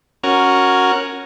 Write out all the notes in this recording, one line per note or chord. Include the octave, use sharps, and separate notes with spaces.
C#4 F#4 A#4